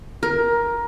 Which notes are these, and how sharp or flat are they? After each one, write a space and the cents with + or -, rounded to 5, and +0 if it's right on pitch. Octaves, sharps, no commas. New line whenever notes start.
A#4 +15